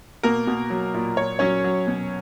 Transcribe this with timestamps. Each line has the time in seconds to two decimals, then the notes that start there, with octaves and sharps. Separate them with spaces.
0.23 B2 A#3 A#4
0.47 B2
0.70 F#3
0.94 A#2
1.17 A#2 C#5
1.39 F#3 C#4 C#5
1.64 F#3
1.87 B2